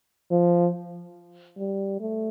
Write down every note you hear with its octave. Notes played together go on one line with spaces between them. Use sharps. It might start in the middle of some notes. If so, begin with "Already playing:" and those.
F3
G3
A3